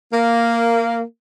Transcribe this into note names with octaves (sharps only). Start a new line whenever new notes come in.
A#3